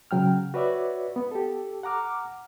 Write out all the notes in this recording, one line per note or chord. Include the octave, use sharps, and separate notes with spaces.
C#3 F#3 G5 F6
F#4 B4 C#5 D5 E5
B3
G4 A4
F#5 A#5 D6 F6